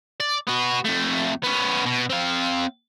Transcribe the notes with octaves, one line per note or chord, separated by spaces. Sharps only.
D5
B3 F#4
F2 A3
B3 C#4
B2
C4 F5